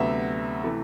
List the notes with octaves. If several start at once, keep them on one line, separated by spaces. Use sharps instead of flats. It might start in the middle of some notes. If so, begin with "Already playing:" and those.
Already playing: D2 C3 F#3 B3 E5
C3 E3 A3